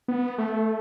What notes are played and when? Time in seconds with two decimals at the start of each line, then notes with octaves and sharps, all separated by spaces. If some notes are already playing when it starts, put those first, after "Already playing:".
0.08 B3
0.38 A3